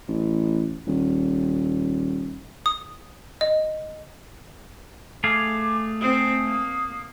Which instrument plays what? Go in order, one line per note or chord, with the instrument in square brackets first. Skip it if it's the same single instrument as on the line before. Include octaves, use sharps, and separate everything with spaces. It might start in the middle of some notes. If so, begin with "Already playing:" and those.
[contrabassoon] A1
D#1
[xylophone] D#6
D#5
[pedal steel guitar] A3 G#4 F5 [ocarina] D6
[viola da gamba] C4 [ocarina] D#6
[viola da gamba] A#3